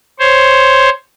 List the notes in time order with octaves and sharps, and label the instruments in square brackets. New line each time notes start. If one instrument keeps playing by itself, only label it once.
[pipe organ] C5 C#5